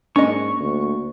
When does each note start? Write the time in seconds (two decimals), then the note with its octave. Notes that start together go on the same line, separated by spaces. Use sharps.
0.16 G#2 A#3 C#4 D4 D#5 C#6
0.60 D2